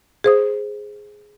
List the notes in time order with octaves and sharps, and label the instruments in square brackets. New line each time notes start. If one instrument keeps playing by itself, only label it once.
[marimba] G#4 C5 D#6